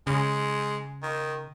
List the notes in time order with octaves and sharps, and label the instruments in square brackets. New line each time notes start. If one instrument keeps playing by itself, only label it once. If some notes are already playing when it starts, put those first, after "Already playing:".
[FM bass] C#3 [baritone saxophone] G#3
[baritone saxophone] D#3